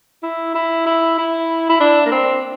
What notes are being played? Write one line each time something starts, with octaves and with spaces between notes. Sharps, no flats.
E4
E4
E4
E4
E4
D4
A#3
C4